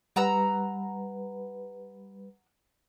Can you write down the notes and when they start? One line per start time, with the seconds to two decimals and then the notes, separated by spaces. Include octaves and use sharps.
0.16 G3 B4 F#5 A#5 E6